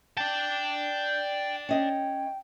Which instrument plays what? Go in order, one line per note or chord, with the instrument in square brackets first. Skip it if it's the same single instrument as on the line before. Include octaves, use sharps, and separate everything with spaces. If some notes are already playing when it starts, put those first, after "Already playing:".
[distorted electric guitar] D5 A5 [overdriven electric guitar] G5
[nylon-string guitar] C#4 D#5 [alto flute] G5